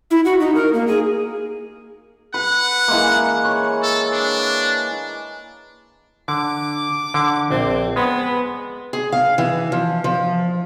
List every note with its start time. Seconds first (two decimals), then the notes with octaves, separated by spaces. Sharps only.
0.11 E4
0.25 F#4
0.40 D#4
0.55 A#4
0.74 A#3
0.88 G#4
2.34 B4 F#5
2.88 E3 G#3 A#3
3.45 C#5
3.82 A4
4.12 D4
6.28 D3 D6
7.14 D3
7.51 A#1 C4
7.96 G#3 B3
8.93 G#4
9.12 F5
9.38 E3
9.72 F3
10.04 F3